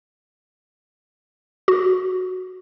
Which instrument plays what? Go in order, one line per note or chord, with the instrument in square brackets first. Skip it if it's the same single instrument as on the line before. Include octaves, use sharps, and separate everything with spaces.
[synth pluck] F#4